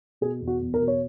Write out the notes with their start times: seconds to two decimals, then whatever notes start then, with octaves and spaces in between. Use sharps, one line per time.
0.21 B2 G#4
0.41 E2
0.47 F#4
0.61 E2
0.74 A#4
0.80 B2
0.88 C#5